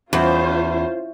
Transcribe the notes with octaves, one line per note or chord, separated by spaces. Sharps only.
E2 C#4 F4 C5